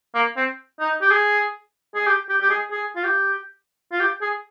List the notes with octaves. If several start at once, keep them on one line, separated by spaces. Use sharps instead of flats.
A#3
C4
D#4
G4
G#4
G#4
G4
G4
G4
G#4
G#4
F4
G4
F4
G4
G#4